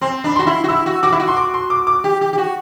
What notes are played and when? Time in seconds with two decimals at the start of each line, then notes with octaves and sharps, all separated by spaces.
0.01 C4 C6
0.24 D4 B5
0.36 F#4 C6
0.47 E4
0.64 F#4
0.68 E4 E6
0.86 F#4
1.03 F#4 D6
1.12 E4
1.20 F#4
1.28 C6
1.37 D6
1.54 C6
1.70 D6
1.87 D6
2.04 G4
2.21 G4
2.33 G4
2.38 F#4